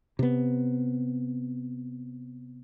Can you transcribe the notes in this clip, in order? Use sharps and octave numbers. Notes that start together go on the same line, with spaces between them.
C3 B3